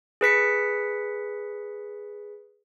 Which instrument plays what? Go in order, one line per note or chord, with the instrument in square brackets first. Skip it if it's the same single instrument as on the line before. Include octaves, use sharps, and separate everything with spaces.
[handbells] G#4 B4 B6 C#7